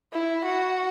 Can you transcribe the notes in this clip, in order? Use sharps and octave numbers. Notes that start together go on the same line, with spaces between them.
E4
F#4